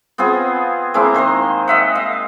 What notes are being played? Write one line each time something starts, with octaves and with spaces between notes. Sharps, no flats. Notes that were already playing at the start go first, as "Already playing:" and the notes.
B3 C4 F4 G#4
G#3 A#3 C4 E4
D#3 C5 A#5 C6
D#5 E5 F#5
F5